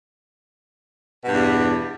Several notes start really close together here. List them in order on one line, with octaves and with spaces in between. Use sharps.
B2 G2 E2 G3